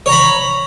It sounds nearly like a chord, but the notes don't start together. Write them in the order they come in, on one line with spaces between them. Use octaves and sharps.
C#5 A#5 B5